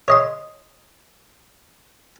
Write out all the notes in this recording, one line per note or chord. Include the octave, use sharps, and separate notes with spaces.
C#5 D#5 C6